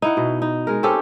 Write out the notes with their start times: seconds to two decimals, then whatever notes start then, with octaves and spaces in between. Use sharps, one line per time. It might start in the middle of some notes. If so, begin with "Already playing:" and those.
0.02 D#4 E4 F#5
0.17 B2
0.42 D#4
0.67 G#3 A#4
0.83 C4 C#4 G4 A4